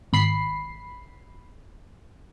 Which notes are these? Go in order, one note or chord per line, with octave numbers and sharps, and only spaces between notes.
G#1 B5 C7